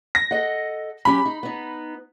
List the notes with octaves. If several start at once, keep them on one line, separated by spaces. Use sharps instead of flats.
A#6
A4 D#5 F#5
F#3 C#4 G4 B5
D#4
B3 D#4